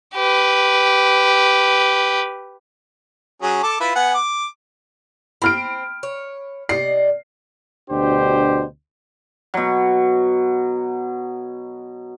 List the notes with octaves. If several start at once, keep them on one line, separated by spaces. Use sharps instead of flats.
G4 B4
F#3 C#4 G#4
A4 A5 D6
E4 F4 B4
B3 F#5 G#5
D6
C4 B5 F6 D7
C#5
C3 D5 D#5 C7
D2 B2 D4 G4 C5
B2 F#3